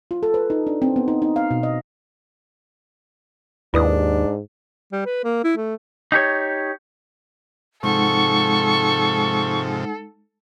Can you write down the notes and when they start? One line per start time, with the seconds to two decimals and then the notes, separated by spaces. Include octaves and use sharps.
0.11 F4
0.23 A4
0.34 B4
0.50 D#4
0.67 D4
0.82 C4
0.96 B3
1.08 D#4
1.22 D#4
1.36 F5
1.51 B2
1.63 D#5
3.74 D#2 G#2 D4 E4 B4 D#6
4.92 G3
5.06 B4
5.24 A#3
5.44 E4
5.57 A3
6.12 D#4 G4 C#5
7.83 G#2 C3 F3 G#3 D#4 A4 F#5 C#6